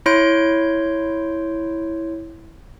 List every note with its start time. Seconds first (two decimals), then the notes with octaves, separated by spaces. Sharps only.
0.06 E4 C#5 C6 G6 D7